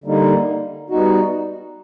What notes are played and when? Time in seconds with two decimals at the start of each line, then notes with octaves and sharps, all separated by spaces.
0.04 D3 G3 A#3 D#4
0.90 G3 B3 D#4 F#4